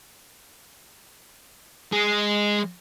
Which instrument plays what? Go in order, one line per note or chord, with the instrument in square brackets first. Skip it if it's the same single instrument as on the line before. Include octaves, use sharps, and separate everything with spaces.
[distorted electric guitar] G#3 G#4